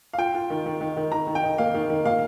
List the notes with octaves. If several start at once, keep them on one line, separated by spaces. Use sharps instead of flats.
F5
F4 G5
F4
D#3
D#3
D#3
D#3
D#3 A#5
D#3
G5
D#4
A#3 F5
D#3
D#3
A#2 F5